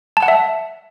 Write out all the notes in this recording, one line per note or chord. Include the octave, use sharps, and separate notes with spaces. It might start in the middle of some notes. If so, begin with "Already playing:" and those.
A5
F#5
E5